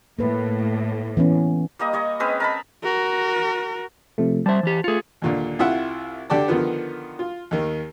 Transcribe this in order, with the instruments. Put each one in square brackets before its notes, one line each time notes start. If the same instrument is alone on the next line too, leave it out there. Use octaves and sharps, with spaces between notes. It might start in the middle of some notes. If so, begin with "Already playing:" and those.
[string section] A2 [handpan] A#3 B4
[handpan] E3 B3 C#4
[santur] G3 A#3 D#5
G3 C#5 D#5
G#3 C4 C#4 B4
A#4 A5 B5
[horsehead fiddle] F#4 A#4
[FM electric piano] C3 F3 A3
[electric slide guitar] G3 E5 [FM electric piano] C5 A5
[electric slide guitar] E3 G4
[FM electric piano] A3 C#7 [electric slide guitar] F4 G#4
[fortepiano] D#2 A#2 D3
C2 E4 F4 E5 F#5
D3 G4 D5 A5
D3 D#3 F3 B3
F4
D#2 D#3